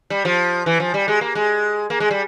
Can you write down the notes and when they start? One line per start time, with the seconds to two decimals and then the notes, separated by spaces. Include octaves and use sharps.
0.10 G3
0.25 F3
0.66 E3
0.80 F3
0.94 G3
1.08 G#3
1.21 A#3
1.35 G#3
1.90 A#3
2.00 G#3
2.11 G3